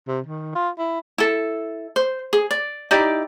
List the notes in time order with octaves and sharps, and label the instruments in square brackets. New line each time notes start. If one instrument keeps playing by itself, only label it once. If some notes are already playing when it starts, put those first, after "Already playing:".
[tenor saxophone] C3
D#3
F4
E4
[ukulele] E4 A4
C5
G#4
D5
D#4 E4 G4 D5